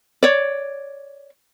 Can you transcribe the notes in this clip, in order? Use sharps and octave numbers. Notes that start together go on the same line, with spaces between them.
C#5 D5